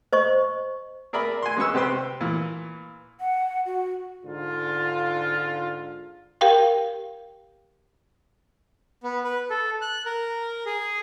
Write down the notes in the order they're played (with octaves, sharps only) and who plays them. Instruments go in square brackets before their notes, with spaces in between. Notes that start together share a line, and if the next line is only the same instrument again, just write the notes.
[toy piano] C5 D#5 C#6
[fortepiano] G#4 A#4 D5 E5 B5
G#5 C6
G#3 C#4 B4 C#6 E6
C3 G4 B4 C5 G5 C6
A#2 E3
[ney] F#5
F#4
[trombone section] G#2 D3 F4
[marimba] G4 A#4 F5 G5
[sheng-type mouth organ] B3
B4
A4
F#6
A#4
G#4